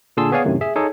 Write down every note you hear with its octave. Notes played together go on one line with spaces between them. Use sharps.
A#2 D3 G#4 A5 C6 E6
B3 G#4 C#5 D5 F5 G#5
F#2 A2 C3 D#3
G#4 E5
D#4 G#4 A4 C#5